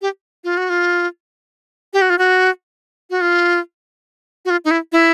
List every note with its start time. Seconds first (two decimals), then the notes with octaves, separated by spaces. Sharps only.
0.02 G4
0.44 F4
0.58 F#4
0.70 F4
1.94 G4
2.02 F#4
2.10 F4
2.19 F#4
3.10 F#4
3.21 F4
4.45 F#4
4.50 F4
4.65 D#4
4.71 E4
4.92 E4